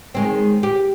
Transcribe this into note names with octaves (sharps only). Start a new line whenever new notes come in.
D#3 G#3 C4
G4